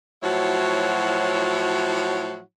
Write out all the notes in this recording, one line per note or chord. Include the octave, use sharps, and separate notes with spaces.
A2 F3 F#3 E4 F#4 C#5